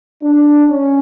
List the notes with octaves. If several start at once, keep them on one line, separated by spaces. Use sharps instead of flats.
D4
C#4